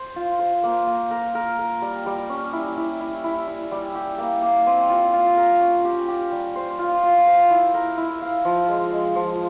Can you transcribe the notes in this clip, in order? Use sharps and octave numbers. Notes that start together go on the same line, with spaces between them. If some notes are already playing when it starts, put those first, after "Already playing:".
Already playing: C5
F4
C5
A#3
A#3
A#4
A#4
A#4
G3
G3
C#4
E4
E4
E4
E4
E4
G3
G4
A#3
A#3
C4
F4
F4
A#4
C#4
G4
G4
G3
C5
F4
F4
C5
E4
A#4
E4
F5
F3
G#3
G#3
F3